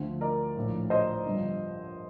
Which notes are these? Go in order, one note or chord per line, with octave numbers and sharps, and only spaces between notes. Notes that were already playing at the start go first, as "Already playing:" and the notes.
Already playing: D2 D3 F3
A#4 D5
A#1 A2 F3
C5 D#5
G1 G2 F3